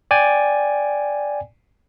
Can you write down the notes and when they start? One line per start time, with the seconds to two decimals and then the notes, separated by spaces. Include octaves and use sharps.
0.11 D5 G5 G#5